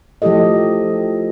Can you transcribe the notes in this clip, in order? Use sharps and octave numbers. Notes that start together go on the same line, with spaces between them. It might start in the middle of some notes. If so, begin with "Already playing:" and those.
F3 A3 E4 G4 A4 D#5